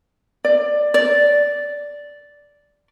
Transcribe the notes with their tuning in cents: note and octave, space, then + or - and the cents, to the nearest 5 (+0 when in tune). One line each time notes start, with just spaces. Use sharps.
D5 +15
D5 -5